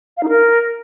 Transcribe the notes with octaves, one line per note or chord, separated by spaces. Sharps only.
F5
D#4
A#4